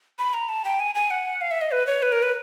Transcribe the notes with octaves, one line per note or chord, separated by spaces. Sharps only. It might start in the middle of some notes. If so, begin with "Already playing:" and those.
B5
A#5
A5
G5
G#5
G#5
F#5
F5
E5
D#5
B4
C#5
B4
A#4
B4